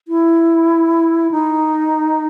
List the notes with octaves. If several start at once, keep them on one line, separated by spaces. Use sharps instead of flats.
E4
D#4